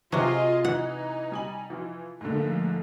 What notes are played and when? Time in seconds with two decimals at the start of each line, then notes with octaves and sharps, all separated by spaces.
0.12 C3 F#3 F4 G#4 D#5
0.65 E3 D#4 F#5
1.32 G3 G#5 F#7
1.70 E3 F3 F4
2.21 G#2 D3 F3 A3 A#3